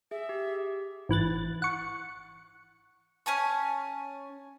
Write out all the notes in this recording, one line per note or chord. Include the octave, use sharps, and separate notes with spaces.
G#4 E5
G4
G#1 E3 F#6 A6
F#5 C#6
C#4 G#5 A5 C#6